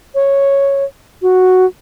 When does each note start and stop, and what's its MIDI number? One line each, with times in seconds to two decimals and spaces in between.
0.15 0.84 73
1.22 1.66 66